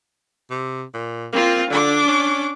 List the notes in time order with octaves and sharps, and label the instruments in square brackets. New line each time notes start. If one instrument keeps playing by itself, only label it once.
[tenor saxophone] C3
A#2
[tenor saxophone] A#3 [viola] C4 F4
[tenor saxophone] D3 [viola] D4 D6
[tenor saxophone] C#4